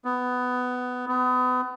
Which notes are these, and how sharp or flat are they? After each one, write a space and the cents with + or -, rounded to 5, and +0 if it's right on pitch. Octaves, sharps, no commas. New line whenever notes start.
B3 +15
B3 +30